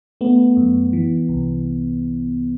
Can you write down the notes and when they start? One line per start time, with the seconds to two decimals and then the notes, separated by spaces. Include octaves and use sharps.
0.21 A3 B3
0.57 F#2
0.93 E3
1.29 C2